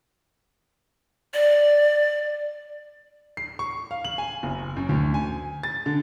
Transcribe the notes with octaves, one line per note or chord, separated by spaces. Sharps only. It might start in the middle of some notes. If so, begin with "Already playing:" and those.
D5
C7
C#6
F5
F#7
G#5
F#1
F#2
D2
G#5
A6
D3